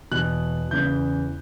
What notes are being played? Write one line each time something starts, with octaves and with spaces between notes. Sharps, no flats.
E2 B2 F#6
E2 C#3 E3 G6